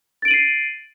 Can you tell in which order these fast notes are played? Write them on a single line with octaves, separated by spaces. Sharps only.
A6 D7 F#7 D#7 C7